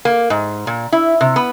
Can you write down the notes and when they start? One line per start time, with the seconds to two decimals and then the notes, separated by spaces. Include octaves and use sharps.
0.05 A#3
0.30 G#2
0.67 A#2
0.92 E4
1.21 C3
1.36 B3